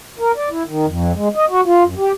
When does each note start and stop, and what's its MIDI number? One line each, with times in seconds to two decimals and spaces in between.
0.19 0.32 70
0.36 0.49 74
0.50 0.63 64
0.66 0.86 51
0.87 1.12 41
1.15 1.28 56
1.35 1.45 75
1.50 1.61 66
1.66 1.83 65
1.84 1.95 42
1.98 2.12 67